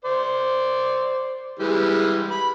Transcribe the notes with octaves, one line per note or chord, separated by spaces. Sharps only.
C5 D5
E3 G3 G#3
B5